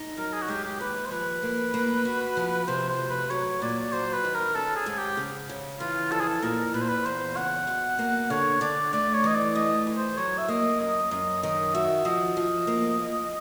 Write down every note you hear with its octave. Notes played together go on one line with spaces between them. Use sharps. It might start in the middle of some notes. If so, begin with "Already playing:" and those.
Already playing: D#4
F#2 A#4
G#4
F#4
G#3 G4
G4
D#2 B4
C5
F3 B4
A#3
A#3
F#4
F3
B4
C3 C5
C5
D2
B4
F#3 C#5
A#2 D5
F#3 C5
B4
D#3
A#4
C#4 A4
G#4
G#2 G#4
G4
C#3
C#3
E3 F4
F2 A4
G#4
A4
A#2 A#4
A#2 B4
C5
B4
E2 C5
C#3 F#5
B2
A#3
D3 C#5
D3 D5
A3 D5
C#5
E3 D#5
D5
A3 D#5
E3
C5
F#3 C#5
E5
A#3 D#5
F#2 D#5
F#2 D#5
D#3 D#5
F#4 E5
F3 D#5
F3
A#3
A#3